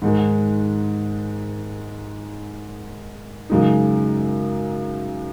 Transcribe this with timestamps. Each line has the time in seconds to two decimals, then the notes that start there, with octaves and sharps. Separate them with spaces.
0.02 G#2 D#3 G#3
3.50 F#2 C#3 G#3 D#4